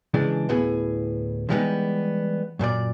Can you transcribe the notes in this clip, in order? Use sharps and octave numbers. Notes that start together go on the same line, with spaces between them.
C#3 E3 G#3 D4
D2 A2 B3 E4 G#4
D3 E3 G3 G#3 B3 D#4
F#2 A#2 A4 D5